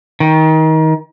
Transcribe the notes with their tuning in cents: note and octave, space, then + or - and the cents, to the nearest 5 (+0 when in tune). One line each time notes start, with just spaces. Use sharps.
D#3 +25